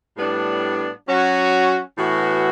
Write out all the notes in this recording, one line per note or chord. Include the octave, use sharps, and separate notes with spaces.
A2 G3 B3 D4
F#3 C#4 F#4
A2 E3 B3 F#4